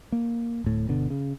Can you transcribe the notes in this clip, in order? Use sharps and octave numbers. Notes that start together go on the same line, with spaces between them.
A#3
D1 A2
G1 B2 D3
C#3